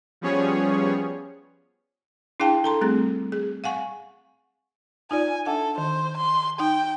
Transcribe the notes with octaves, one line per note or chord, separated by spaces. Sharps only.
F3 G3 B3 C#4 G#4 C#5
D4 E4 G#4 F5 G5 A5
A4 A#5 C6
G3 A3 C4 G#4
G#4
F5 F#5 G#5 C#6
D#4 F4 D5 G#5
D4 A4 E5 F#5
D#3 C5
C6
D#4 G5